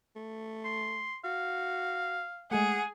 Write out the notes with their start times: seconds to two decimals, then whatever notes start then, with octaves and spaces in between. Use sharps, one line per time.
0.16 A3
0.65 C6
1.24 F#4 F5
2.51 G#3 A3 G#4 F#5